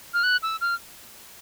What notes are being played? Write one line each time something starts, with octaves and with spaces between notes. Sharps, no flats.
F6
F#6
E6
F6